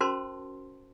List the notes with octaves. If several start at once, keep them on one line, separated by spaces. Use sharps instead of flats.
C#4 F#4 A#4 C5 A5 C6